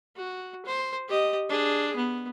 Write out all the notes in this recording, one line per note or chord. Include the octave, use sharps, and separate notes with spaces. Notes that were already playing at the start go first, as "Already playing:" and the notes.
F#4
C5
G4 D#5
D4 G#4
B3